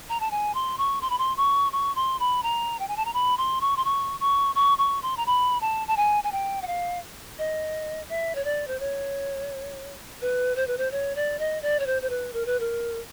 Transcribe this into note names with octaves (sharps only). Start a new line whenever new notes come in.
A#5
A5
G#5
C6
C#6
C6
B5
C6
C#6
C#6
C6
B5
A#5
G5
G#5
A5
A#5
B5
C6
C#6
C6
C#6
C#6
C#6
C#6
C6
A#5
B5
A5
A5
G#5
G#5
G5
F#5
F5
D#5
E5
C#5
D5
C5
C#5
B4
C5
B4
C5
C#5
D5
D#5
D5
C#5
C5
C5
B4
A#4
B4
A#4